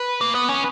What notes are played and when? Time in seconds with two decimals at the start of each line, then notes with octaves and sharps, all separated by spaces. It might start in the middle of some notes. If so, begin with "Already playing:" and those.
Already playing: B4
0.21 A#3
0.35 B3
0.49 C#4